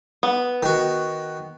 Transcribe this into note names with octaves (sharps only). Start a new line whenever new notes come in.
B3
D#3 F#4